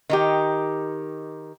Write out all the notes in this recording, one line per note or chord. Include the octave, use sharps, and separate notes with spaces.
D#3 D#4 G4